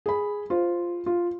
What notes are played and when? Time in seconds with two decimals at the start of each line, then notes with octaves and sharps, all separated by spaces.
0.06 G#4 B5
0.50 F4 C5
1.06 F4